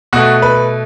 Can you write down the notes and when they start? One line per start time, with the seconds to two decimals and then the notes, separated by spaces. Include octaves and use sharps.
0.13 B2 A3 F#4
0.42 B4